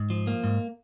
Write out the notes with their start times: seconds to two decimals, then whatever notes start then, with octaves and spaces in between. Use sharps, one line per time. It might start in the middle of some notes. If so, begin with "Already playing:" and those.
Already playing: G#2
0.10 F3
0.27 A#3
0.44 G#2